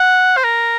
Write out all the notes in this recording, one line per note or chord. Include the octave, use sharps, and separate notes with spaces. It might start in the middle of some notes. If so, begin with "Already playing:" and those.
Already playing: F#5
C5
A#4